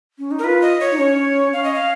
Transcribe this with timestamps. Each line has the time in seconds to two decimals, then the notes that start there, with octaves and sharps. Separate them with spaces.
0.19 C#4
0.31 D#4
0.39 A#4
0.44 F4 B4
0.62 D#5
0.80 C#5
0.92 D#4
0.98 C#4 C#5
1.53 C#4 F5
1.64 D#5
1.74 F5